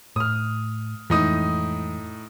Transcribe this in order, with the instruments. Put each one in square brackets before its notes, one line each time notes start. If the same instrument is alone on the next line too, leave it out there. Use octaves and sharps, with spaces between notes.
[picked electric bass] A2 [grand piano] D#6 F6
[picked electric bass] F2 E3 G#3 [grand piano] A2 D#4 D#6